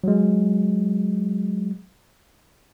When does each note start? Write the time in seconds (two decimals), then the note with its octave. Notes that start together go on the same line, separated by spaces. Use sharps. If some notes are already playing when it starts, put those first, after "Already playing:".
0.04 F#3 G#3